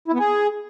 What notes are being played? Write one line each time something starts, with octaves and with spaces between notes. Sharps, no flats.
E4
B3
G#4